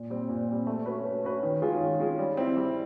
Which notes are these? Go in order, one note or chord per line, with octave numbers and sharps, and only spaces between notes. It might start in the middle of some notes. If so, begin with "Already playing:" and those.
Already playing: A#2
G3 C4
A#2
G3 C4
A3
C#4 F#4 B4
A3
C#4 F#4 B4
D#3
G#3 C#4 F4 G#4
D#3
G#3 C#4 F4 G#4
G3
C4 E4
G3